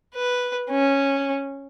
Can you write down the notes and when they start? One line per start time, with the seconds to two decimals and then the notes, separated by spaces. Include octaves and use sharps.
0.15 B4
0.70 C#4